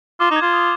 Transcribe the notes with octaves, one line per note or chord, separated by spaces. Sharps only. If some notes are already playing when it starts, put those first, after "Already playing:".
F4 D6
D#4
G#6
F4
D#6